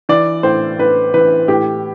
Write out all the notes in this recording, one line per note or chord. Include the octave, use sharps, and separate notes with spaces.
E3 D5
A2 C5
A2 B4
E3 B4
A2 G4